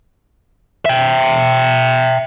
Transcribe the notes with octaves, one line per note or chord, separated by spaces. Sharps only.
E5 G5